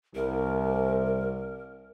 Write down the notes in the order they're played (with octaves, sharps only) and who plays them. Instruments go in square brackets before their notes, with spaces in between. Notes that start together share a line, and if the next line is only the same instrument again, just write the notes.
[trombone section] C2 [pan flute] A#4